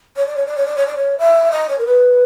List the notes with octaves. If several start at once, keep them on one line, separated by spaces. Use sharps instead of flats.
C#5
D5
C#5
D5
C#5
D5
C#5
D5
C#5
E5
D#5
C#5
A#4
B4